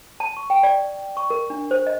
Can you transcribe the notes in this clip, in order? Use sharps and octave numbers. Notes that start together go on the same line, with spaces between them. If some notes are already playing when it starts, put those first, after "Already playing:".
A5
C#6
G5
D5
C#6
A#4
D4
C5
D#5